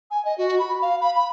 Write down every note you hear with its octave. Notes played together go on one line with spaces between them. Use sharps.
G#5
D#5
F#4
B5
F5
B5
B5